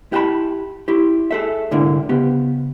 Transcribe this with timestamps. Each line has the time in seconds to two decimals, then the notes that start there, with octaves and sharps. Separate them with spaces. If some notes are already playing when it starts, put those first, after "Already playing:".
0.12 E4 G4 F#5 G5 A5 B5
0.88 E4 G4
1.31 G#4 A4 E5
1.71 C2 G#2 D3 A#3 E4
2.09 C#3 B3 G4